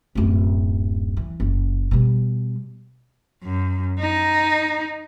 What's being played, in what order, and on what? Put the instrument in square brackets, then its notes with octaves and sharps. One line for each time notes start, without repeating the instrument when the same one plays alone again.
[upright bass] D1 F#2
E3
F#1
B2 G3
[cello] F#2
D#4